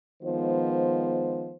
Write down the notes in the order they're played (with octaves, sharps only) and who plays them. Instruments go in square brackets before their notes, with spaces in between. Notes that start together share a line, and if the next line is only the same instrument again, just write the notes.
[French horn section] D#3 F3 G#3 B3 C5